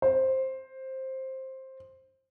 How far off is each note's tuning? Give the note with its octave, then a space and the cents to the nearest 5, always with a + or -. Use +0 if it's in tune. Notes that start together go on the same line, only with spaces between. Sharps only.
C5 +10